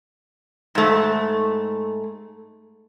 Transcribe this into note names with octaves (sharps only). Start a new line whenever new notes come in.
G#2 A3